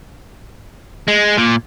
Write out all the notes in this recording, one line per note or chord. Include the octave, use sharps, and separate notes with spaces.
G#3
A#2